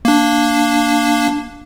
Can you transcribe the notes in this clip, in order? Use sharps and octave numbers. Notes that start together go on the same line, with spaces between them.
A#3 D4